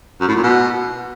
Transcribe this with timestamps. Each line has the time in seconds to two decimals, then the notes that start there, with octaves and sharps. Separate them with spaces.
0.21 F#2
0.28 A2
0.36 A#2
0.43 B2